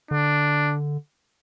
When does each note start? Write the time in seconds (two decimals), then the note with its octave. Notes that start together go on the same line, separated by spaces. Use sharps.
0.11 D3 D4